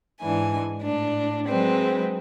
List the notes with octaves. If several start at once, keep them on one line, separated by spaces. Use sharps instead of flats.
G#2 E3 D4 G#5
A2 D4
F#3 G#3 C4 B4